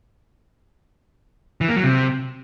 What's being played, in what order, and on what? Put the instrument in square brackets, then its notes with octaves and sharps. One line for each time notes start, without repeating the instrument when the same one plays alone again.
[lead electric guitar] E3
A#3
F#3
C3